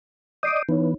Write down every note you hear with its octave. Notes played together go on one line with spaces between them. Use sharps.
D5 D#5 D#6 G6 C7 D7
E3 B3 D#4 C#5